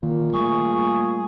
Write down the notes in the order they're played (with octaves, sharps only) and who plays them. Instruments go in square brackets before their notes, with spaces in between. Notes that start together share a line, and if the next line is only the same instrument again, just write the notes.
[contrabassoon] A#2 [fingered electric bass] D#3
[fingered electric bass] G3 A3 [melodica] G#4 [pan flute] C#6